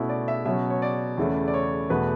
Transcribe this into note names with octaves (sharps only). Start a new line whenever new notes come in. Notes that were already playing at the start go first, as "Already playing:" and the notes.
Already playing: B2 A3 C#4 E4
D5
E5
B2 F#3 C#4 E5
C#5
D5
E2 C#3 E3 A3 C#4
D5
C#5
E2 B2 A3 B4